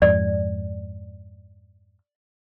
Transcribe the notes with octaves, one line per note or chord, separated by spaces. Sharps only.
F2 G#2 D5